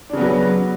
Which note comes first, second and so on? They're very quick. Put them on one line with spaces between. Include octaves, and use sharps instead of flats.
D4 C#3 B3 F#3